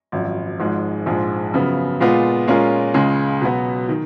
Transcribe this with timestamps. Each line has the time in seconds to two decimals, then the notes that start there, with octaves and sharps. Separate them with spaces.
0.12 G#1 F#2 F3
0.59 G#1 G#2 F3 G#3
1.06 A#1 G#2 F3 G#3
1.53 F#2 C#3 F3 B3
2.00 A#2 G#3 B3 F4
2.47 A#2 G#3 C#4 F4 A#4
2.94 C#2 C#3 G#3
3.41 B2 F#3 B3
3.89 D#3